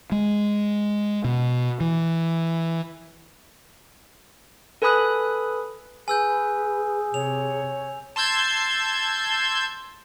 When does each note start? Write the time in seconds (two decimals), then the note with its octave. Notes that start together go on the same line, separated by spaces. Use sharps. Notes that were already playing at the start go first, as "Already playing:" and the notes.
0.12 G#3
1.24 B2
1.80 E3
4.82 A4 B4 G#5 B5 D#6 F#6
6.08 G#4 B4 G#5 E6 G6
7.14 C3 C#5 F7
8.16 A5 C6 E6 G6 G#6